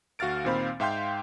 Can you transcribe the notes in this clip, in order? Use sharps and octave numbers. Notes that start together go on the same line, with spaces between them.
D2 F#4 F5 F6 A6 D7
A#2 D#3 C4 C5 F5 B5
G#2 E5 F5 G5 C6 G6